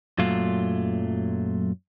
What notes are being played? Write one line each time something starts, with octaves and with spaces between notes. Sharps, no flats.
F#2 A#2 F#3 A3 F4